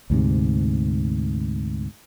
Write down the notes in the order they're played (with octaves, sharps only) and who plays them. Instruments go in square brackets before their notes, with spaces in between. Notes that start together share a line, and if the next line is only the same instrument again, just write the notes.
[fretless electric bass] D2 G#2 C3